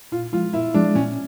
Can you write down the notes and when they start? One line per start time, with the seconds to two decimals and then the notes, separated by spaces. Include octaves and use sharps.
0.12 A#2 F4
0.33 F3 G#3 F4
0.53 A#2 E4
0.74 F3 G#3 D4
0.95 A#2 C#4